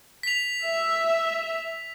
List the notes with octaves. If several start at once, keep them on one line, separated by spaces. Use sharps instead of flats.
B6 F7
E5